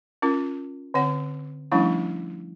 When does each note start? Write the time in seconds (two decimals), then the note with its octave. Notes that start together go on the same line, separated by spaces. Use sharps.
0.22 C#4 F4 A#4
0.94 D3 C4 C#5 F#5
1.72 F3 G3 A3 C#4 D4 E4